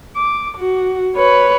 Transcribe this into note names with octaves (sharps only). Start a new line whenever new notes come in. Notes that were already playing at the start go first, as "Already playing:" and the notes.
D6
F#4
B4 C#5